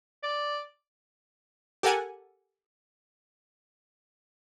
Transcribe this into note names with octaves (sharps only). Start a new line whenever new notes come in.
D5
G4 A4 A#4 F#5 G#5